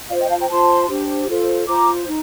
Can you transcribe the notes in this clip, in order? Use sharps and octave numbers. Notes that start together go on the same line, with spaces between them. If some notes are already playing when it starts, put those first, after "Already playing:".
F4 C5 D5 F5
D#5 G5
F5 A5
G5 A#5
F4 C5 A5 C6
D4 G4 C5
F4 A4 C5
F4 C5 A#5 D6
D#4